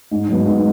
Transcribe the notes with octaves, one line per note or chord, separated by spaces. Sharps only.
G#2
F#3 B3
G#2